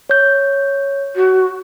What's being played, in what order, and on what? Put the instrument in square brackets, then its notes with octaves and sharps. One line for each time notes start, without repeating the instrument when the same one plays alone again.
[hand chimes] C#5 G6
[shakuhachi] F#4